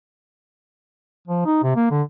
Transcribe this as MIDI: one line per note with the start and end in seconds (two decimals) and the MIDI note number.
1.28 1.43 53
1.46 1.60 63
1.63 1.75 48
1.76 1.90 58
1.91 2.02 50